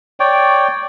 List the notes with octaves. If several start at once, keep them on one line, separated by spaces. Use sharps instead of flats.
C#5 D5 G5